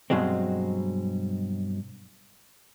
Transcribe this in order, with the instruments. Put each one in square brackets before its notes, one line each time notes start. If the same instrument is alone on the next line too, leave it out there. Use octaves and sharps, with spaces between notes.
[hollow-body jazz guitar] G2 B2 F#3 G#3 C4